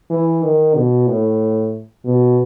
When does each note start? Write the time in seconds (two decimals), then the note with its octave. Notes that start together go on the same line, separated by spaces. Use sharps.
0.11 E3
0.43 D#3
0.76 B2
1.08 A2
2.05 B2